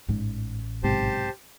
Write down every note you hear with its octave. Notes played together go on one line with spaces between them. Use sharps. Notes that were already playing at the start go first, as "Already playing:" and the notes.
A1 G#2
B1 G#2 C3 G4 C5 A5